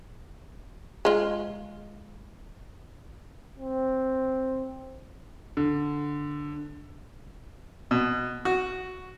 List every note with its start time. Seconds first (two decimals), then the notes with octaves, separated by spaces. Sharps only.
1.05 G#3 F4
3.57 C4
5.57 D3
7.91 B2
8.45 F#4